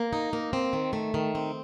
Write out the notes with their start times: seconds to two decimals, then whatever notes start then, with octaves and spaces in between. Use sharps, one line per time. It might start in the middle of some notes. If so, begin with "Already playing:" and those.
Already playing: A#3
0.13 D#4
0.33 A#3
0.53 C4
0.73 D#3
0.93 A3
1.14 D#3
1.35 C4